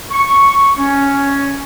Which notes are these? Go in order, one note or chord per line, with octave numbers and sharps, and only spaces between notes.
C#6
C#4